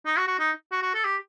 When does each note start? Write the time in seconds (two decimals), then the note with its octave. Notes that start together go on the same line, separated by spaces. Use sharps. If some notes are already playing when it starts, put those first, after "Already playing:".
0.06 D#4
0.17 F#4
0.28 F#4
0.39 D#4
0.72 F#4
0.82 F#4
0.94 A4
1.05 G4